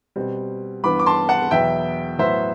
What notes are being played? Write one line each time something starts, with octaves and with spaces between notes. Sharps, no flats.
B2 G3 C4
G2 E3 B3 B5 D6
D6
A5 C6
F#5 A5
E2 B2 F#3 B3 E5 G5
A2 F#3 B3 C5 E5